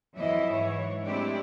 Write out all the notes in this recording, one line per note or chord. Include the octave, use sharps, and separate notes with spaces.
F2 E3 F#3 E4 D#5 E5
G#2 E3 F#3 C#5
G#3 A3 C4 D4 E4 G4